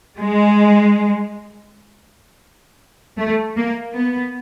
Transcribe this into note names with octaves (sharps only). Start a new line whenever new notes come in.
G#3
A3
A#3
B3